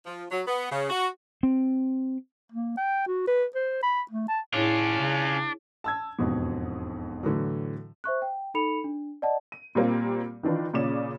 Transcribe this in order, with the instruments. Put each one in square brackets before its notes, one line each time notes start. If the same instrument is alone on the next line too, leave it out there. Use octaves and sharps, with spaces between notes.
[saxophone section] F3
F#3
B3
C#3
F#4
[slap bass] C4
[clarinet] A#3
G5
F#4
B4
C5
B5
A3
A5
[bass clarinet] A2 [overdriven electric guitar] C#4 F4 [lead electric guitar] D4 [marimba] E4 G#4 C#5
[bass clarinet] C#3
[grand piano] A5 E6 G#6
E1 F2 G#2 B2
A2 D3 E3 F#3
[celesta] C5 E5 C#6 F#6
G5
D#4 A4 B5 C#7 F7
D4
D5 D#5 F#5 A5
[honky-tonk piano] D#7
A#2 G3 A#3 C4
D#3 E3 D4 F4 B4
A#2 C#3 C#4 D5 E7